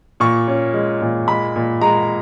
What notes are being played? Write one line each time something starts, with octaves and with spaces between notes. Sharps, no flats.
A#2 C#6
C#4
G#3
A#2
G#3 B5
A#2
G#3 A#5